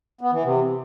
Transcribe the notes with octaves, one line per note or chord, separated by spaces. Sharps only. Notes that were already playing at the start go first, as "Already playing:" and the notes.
B3
E3
C3